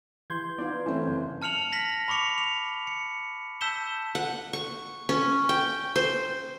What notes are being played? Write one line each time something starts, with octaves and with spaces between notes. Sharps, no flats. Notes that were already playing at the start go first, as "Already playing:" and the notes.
E3 C6 G6 G#6
B3 D#4 F4 D5
E3 A3 C4 C#4
F#1
A5 F6 C#7 F7 F#7
A#6 B6 F#7
B5 C#6 D6 C#7 F7
F7
C#7
A5 E6 G6 B6 E7 G7
F#5
C#6
C#4
G5
C5